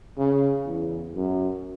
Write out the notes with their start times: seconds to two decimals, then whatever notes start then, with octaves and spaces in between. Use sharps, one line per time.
0.17 C#3
0.66 E2
1.15 F#2